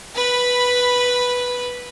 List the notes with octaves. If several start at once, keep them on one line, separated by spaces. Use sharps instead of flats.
B4 B5